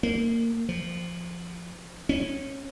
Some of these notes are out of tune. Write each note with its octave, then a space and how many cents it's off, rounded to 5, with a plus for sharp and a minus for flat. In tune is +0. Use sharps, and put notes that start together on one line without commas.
A#3 -20
F3 -10
C#4 -20